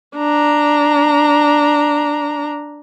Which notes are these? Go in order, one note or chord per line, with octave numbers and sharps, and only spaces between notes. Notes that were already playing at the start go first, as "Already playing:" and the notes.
D4 A#5